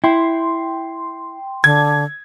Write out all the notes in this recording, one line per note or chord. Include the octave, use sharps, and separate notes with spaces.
E4 G5 C6
D3 G#6